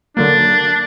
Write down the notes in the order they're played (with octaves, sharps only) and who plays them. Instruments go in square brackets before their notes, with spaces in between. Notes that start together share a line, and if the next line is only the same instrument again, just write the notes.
[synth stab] D3 F#3 A#3 [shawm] D4